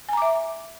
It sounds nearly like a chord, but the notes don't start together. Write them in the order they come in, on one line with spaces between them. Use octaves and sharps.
G#5 A#5 D6 E5